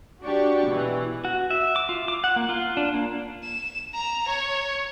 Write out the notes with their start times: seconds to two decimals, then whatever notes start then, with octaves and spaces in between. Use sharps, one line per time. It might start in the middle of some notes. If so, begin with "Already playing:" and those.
0.23 D4 F#4 G4 C#6
0.67 B2 E3
1.25 F#4
1.51 E5
1.76 D6
1.89 F4
2.08 D6
2.24 F#5
2.36 A#3
2.49 F4
2.77 D4
2.94 A#3
3.44 E7
3.94 A#5
4.27 C#5